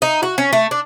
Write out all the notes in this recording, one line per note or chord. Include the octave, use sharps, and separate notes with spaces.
D#4
F#4
C#4
A3
D4